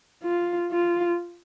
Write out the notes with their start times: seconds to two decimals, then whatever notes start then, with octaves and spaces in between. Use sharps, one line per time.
0.24 F4
0.72 F4